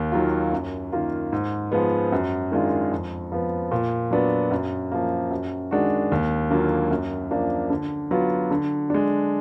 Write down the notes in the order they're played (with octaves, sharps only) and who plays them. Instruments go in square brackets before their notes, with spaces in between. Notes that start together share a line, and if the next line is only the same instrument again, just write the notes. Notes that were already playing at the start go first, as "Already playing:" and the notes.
Already playing: [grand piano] D#2
D#3 F#3 A#3 F4
F#2
D#3 A#3 F4
G#2
F3 G#3 B3
F#2
D#3 G#3 D4 F4
F2
F3 B3
A#2
F#3 B3 D4
F#2
F3 A#3
F#2
D#3 G#3 D4 F#4
D#2
D3 F#3 A#3 F4
F#2
F3 A#3 D4
D3
F#3 B3 F4
D3
G#3 D4